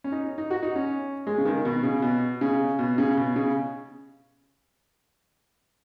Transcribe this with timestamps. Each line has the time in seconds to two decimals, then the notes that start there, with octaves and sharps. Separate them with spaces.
0.04 C#4
0.12 D#4
0.38 D#4
0.51 F#4
0.63 D#4
0.76 C#4
1.27 G#3
1.38 C#3
1.45 D#3
1.65 B2
1.83 C#3
2.02 B2
2.41 C#3
2.79 B2
2.98 C#3
3.17 B2
3.36 C#3